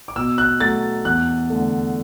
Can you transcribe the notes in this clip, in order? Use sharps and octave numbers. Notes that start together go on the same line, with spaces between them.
D6
B2 E6
F#6
F#3 A3 A6
E2 F#6
D3 A3